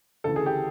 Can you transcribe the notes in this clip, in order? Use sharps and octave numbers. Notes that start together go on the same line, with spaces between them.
D2 C#3 E3 A4
G#4
G4